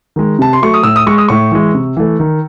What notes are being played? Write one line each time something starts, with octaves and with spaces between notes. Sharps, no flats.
D#3 G#3
C3 A5
C6
F#3 A3 C#6
D#6
A2 E6
D#6
G#3 C#6
D#6
A2 C#6
E3 G#3
C3
E3 A3
D#3